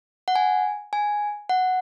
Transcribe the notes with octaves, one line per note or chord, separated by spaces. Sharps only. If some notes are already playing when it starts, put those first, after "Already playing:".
F#5
G#5
G#5
F#5